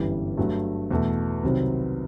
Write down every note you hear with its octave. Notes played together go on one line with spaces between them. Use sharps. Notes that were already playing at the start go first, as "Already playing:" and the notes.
Already playing: G1 F#2 E3 G3
G2 F#3 A3
E2 B2 A3
C2 C3 D#3 F#3 C4